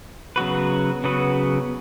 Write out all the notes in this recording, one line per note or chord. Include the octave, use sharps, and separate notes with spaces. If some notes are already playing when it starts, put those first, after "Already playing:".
C#3 F#3 B3 F#4 B4
C#3 F#3 B3 F#4 B4